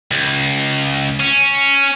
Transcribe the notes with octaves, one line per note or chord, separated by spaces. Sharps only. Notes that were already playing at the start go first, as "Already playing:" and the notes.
C#2
C#4